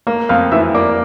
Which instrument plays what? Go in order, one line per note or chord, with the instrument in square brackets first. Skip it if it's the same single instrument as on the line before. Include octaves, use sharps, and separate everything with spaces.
[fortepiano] A#3 [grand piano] F5 F6
[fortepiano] F2 [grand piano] F5 F6
[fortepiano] E3 [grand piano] E5 E6
[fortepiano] A#3 [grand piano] D5 D6